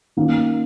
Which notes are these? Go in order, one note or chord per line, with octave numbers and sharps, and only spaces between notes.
D#3 A#3 C#4